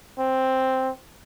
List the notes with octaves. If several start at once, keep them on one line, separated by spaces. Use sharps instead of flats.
C4